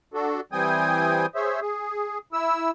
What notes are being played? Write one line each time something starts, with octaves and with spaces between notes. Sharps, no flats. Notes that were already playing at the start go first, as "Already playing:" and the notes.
D4 F#4 A4
E3 G3 C4 G5 G#5 D#6
G#4 C5 C#5 E5
G#4
E4 E6